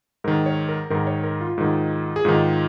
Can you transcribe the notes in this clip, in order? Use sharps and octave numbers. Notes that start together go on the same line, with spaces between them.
G#2 D#3 A#4
C#5
A#4
G#2 D#3 A#4
C#5
A#4
F4
G#2 D#3
G#4
G#2 D#3 F4